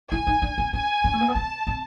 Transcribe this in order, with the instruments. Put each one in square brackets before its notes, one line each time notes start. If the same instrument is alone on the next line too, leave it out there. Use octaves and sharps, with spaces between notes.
[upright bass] E4 [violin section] G#5
[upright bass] D#4
D4
C4
[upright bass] C#4 [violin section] G#5
[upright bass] C#4
A3
A#3
B3
[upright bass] C4 [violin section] A5
[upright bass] C4